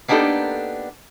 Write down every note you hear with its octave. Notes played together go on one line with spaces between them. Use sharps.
A#3 B3 D4 D#4 G4 A4